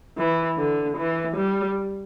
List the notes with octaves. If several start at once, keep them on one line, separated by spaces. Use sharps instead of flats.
E3
D3
E3
G3